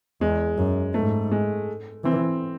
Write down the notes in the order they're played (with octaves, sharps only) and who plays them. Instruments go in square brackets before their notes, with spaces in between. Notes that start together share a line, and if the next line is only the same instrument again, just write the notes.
[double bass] E2 [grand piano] G#3
[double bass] F#2
[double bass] G#2 [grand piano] A3
[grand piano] G#3
[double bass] E3 [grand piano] C4